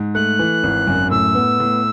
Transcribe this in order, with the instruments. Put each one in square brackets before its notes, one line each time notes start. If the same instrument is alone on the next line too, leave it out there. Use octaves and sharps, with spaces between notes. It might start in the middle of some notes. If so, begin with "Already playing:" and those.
Already playing: [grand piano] G#2
[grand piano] A3 [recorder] F#6
[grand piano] E3
G#1
F#2
[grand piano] A2 [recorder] E6
[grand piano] B3
A2